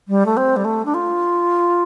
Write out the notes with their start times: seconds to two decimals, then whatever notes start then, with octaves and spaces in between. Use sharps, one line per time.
0.08 G3
0.26 A3
0.37 C4
0.56 G3
0.64 A3
0.85 D4
0.94 F4